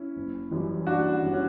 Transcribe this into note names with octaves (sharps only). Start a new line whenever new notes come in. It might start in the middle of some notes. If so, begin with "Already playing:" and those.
Already playing: C#4 E4
F#1
F#2 E3 G3
F#1 D4 F#4
F#2 E3 G3
C#4